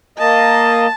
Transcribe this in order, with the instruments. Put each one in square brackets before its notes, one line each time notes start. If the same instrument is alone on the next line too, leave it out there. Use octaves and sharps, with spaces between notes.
[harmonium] A#3 D#5 [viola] A5